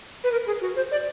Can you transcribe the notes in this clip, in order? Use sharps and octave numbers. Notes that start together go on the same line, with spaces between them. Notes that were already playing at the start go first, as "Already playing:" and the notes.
B4
A#4
G#4
F#4
C5
D5